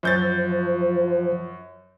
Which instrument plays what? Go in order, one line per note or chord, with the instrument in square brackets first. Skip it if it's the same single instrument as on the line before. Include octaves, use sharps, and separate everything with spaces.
[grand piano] F#2 G6 A6 [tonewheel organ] F3